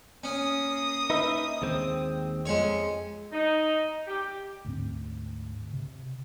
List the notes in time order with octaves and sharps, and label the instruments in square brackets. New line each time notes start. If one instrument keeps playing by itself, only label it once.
[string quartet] A#3 D#6 [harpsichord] C#4
[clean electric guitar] D#4 B4 E5
D#2 G#3 C4
[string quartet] F2 [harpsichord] G#3 C#5
[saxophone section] D#4
G4
[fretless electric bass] D2 G#2 C4
C3